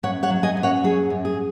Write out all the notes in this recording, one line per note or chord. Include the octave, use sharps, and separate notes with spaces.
F#2 C#5 F#5
C#5 F#5
F#3
D#5 G#5
F#2
C#5 F#5
F#3 G#4 C#5
F#2
G#4